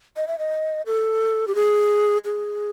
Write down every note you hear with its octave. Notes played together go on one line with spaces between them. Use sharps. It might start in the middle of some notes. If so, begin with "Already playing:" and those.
D#5
E5
D#5
A4
G4
G#4
G#4